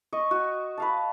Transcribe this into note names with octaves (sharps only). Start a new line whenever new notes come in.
D#5 C#6
F#4
B4 F5 A5